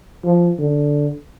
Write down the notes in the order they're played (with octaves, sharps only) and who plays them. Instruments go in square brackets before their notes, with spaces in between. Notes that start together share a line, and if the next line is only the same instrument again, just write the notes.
[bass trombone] F3
D3